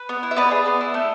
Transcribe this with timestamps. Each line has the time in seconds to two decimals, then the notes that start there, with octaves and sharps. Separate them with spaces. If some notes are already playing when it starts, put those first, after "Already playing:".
Already playing: B4
0.09 B3
0.23 E4
0.31 E5
0.36 B3 B4 D5
0.51 G#4
0.66 B3
0.81 E4
0.94 A3